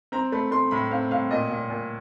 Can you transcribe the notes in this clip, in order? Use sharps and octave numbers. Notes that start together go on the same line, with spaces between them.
C4 A#5
A3 B5
A3 C6
A2 B5
C4 F5
A2 F5
A#2 D#5
A#2
A#2